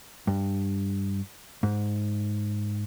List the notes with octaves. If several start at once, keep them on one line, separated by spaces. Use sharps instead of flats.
G2
G#2